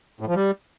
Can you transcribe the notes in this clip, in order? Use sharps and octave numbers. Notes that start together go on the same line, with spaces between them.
A2
F3
G3